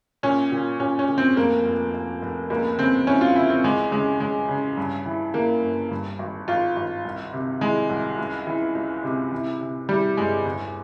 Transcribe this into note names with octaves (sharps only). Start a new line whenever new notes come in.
A#2 C#4
A#2
A#2 C#4
C#4
A#2
C4
F1 A#3
F1
F1
F1
C#2 A#3
C#3 C4
E3 C#4
F4
C#3 E4
C4
E2 G#3
C#3 G#3
C#3 G#3
C#3
G2
E3
E3 A#3
G1
G2
G#1
G#1 F4
G#1
C2
C3
E3 G#3
C2
C#2
E3
C#2
C3
E3
C3
E3 G3
G1 G#3
E2